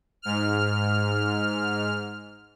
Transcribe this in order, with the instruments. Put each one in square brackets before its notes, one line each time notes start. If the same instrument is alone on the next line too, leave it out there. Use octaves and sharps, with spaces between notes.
[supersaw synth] G#2 F6